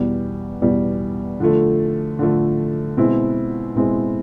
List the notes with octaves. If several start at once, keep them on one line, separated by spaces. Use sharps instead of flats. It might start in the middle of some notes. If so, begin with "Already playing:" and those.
Already playing: E2 B2 G3
E2 B2 G3
D3 F3 A3
D3 F3 A3
B2 G#3 C4 E4
B2 G#3 C4 E4